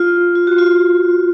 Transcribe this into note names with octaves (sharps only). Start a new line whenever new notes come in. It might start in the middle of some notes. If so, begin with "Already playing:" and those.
Already playing: F4
F4
F#4
F4